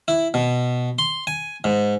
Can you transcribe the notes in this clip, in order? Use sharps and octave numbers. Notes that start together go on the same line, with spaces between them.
E4
B2
C6
G#5
G#2